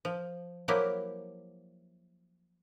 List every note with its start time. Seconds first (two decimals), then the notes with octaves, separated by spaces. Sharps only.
0.05 F3
0.68 F3 F#3 A#3 E4 G4